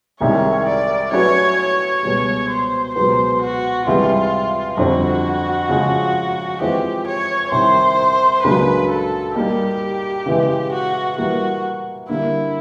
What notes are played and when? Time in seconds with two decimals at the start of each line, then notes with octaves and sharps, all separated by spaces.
0.20 C2 C3 D#3 G#3 C#5
0.66 D5
1.12 F#3 A3 C#4 F#4 B4 C#5
1.57 C#5
2.03 C#2 B2 G3
2.49 C5
2.94 C#2 B2 F#3 B3 C5
3.41 F#4
3.86 C#2 C3 E3 G3 F4
4.77 F2 D3 G3 C4 F#4
5.69 C#3 F3 G#3
6.60 E3 G#3 C4 F4 G4
7.06 C#5
7.51 C2 C3 D#3 C5
8.43 C#2 C#3 F#3 A#3 D4 B4
8.90 A4
9.35 G3 A#3 D#4 G4
10.26 C#3 E3 G#3
10.72 F#4
11.18 E3 G3 A#3 F#4
12.09 D3 G3 A#3 E4